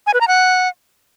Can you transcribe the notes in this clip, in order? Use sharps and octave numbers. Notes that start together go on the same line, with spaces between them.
G#5
B4
A#5
F#5